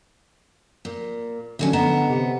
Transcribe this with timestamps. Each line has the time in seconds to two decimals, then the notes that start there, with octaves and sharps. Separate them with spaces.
0.85 A#2
1.59 E2 D3 F#3 C#4
1.73 B3 D#5 A#5 E7
2.09 C3 G4 F#5